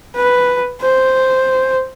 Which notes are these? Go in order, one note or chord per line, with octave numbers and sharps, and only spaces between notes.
B4
C5